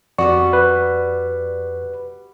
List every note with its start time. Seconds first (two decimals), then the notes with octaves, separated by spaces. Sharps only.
0.18 F2 G3 B3 F#4 D5 C#6
0.53 B4